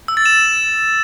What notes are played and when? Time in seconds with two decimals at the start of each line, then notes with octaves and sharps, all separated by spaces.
0.08 E6
0.17 A6
0.26 E7